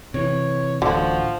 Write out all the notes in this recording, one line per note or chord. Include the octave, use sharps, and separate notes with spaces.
C3 E3 C#5
D1 A1 D3 F3 F#4